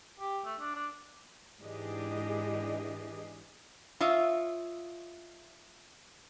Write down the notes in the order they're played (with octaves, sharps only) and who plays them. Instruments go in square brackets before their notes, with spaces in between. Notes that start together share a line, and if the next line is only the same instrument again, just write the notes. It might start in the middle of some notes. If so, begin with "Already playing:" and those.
[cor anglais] G4
A3
D4
D4
[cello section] G#2 E3 D4 G4 G#4 D#5
[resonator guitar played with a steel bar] F4 C#5 D#5 E5